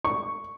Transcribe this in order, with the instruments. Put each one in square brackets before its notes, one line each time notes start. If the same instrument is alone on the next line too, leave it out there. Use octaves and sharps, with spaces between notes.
[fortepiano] C#6